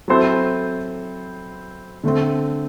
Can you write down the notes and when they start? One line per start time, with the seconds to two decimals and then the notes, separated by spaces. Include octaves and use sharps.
0.08 F#3 C4 E4 A4 C5
2.04 D3 A3 C4